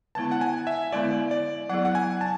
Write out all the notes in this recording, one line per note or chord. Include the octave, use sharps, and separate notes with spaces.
D3 G#3 B3 E4 A5
F#5
G#5
E5
D3 G#3 B3 E4 D5
D5
F#3 B3 E4 G#4 F#5
F#5
G#5
A5